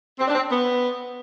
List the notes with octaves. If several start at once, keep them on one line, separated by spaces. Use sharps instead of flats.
C4
D4
C4
B3